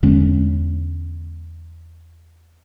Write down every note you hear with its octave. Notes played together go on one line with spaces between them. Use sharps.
E2 D3 G#3 C#4